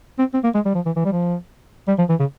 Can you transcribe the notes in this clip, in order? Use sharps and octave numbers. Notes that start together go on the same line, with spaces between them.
C4
C4
A#3
G#3
G3
F3
E3
E3
G3
F3
G3
F3
E3
C#3